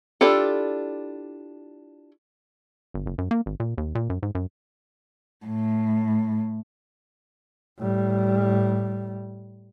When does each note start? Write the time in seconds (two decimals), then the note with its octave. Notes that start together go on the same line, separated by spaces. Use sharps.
0.21 D4 E4 F4 G4 A4
2.94 G1
3.06 F#1
3.18 F#2
3.31 A#3
3.46 G#1
3.60 A#2
3.78 D#2
3.95 A#2
4.10 F#2
4.23 G#2
4.35 F#2
5.46 A2
7.78 A2 G3